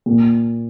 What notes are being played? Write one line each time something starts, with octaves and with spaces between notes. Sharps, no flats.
A#2